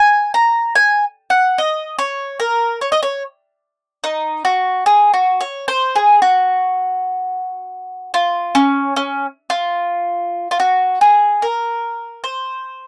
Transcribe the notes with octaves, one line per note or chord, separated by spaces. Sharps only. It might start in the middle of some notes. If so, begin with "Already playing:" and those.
Already playing: G#5
A#5
G#5
F#5
D#5
C#5
A#4
C#5
D#5
C#5
D#4
F#4
G#4
F#4
C#5
C5
G#4
F#4
F4
C#4
C#4
F4
F4
F#4
G#4
A#4
C5